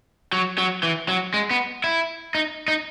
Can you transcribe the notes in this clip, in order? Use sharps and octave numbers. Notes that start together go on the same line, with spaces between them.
F#3
F#3
E3
F#3
G#3
B3
E4
D#4
D#4